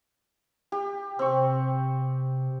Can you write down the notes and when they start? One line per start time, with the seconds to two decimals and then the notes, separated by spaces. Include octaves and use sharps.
0.72 G4
1.19 C3 C4 C#6